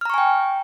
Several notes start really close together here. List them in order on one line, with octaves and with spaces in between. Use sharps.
F6 A#5 C#6 G#5 G5